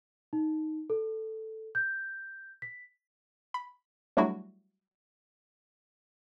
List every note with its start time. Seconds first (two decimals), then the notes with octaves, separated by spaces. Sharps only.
0.33 D#4
0.90 A4
1.75 G6
2.62 B6
3.54 B5
4.17 F#3 G3 A3 D4 E4 F#4